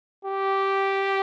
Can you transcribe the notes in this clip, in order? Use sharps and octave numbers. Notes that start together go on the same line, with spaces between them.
G4